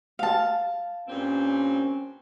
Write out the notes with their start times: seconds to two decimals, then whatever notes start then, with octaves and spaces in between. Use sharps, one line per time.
0.19 F5 A5
1.08 G2 A#2 C4 C#4